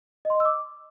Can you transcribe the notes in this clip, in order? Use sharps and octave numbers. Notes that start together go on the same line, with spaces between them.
D#5
C6
D#5
E6
D6